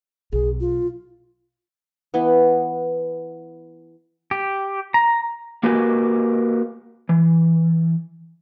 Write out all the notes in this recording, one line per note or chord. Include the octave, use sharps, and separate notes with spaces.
B1 G#4
F4
E3 B3
G4
A#5
A#3 F#4 G4 A#4 B4 G#5
E3